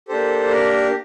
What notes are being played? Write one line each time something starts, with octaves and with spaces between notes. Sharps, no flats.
A#3 D4 G4 A4 C5
A#4